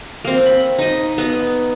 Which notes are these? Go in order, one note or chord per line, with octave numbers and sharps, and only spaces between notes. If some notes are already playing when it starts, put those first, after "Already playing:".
A#3 C4
B5
D#4 D#5
B3 D#4